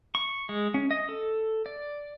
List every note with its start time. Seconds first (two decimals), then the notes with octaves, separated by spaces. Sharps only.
0.15 C#6
0.49 G#3
0.74 C#4
0.91 D#5
1.09 A4
1.66 D5